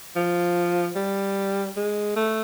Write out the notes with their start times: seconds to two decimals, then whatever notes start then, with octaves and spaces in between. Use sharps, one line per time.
0.16 F3
0.96 G3
1.76 G#3
2.16 A3